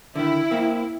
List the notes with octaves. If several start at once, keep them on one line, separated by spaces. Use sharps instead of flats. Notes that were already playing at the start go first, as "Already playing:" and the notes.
D3 D#3 E4
A#3 C4